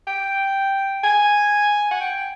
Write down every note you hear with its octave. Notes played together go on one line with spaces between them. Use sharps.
G5
G#5
F#5
G5